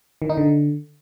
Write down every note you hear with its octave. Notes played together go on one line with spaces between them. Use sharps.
D#3
D#4
D3